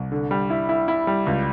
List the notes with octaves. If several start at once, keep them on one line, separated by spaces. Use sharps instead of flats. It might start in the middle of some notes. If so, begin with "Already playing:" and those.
Already playing: C2
D3
G3
E4
E4
E4
G3
C#2